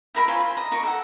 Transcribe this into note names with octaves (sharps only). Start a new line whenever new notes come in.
E4 A#4 B5
F4 C5 C#5 G#5
C6
D#5 A#5
D#4 A#4 C#6
A4 F#5